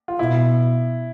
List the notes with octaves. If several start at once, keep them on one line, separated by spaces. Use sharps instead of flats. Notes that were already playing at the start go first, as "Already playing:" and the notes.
F4
B2 E4